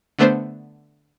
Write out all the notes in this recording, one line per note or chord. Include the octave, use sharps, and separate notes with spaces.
D3 A3 B3 D4 C5